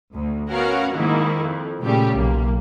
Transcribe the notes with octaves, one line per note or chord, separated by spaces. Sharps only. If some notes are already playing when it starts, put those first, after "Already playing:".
D2
B3 C#4 F#4 A#4 F5 F#5
G#2 D#3 A#3 E4
F2
A#2 C#3 G3 A3 G4
B1 A#3